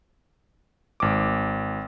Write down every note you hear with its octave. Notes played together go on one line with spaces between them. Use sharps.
G#1 D6